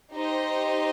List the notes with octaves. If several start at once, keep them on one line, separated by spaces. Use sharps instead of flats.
D#4 G4 C5 D#5